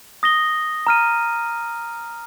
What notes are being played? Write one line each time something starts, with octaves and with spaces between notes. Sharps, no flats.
D#6 A#6 G7
A#5 F6 D#7